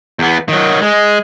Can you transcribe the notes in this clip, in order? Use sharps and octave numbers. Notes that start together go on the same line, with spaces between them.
E2 B3
D#3 F#3
G#3